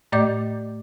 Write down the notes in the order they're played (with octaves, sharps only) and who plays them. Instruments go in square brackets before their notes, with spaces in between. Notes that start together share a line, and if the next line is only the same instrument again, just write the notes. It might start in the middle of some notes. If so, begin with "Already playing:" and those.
[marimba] A2 A3 D5 D#5 D6 G6